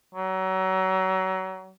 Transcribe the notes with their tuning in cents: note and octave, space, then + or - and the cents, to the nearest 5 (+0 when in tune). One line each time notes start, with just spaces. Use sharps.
F#3 +30